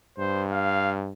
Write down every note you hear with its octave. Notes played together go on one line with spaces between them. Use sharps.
G2 C5
F5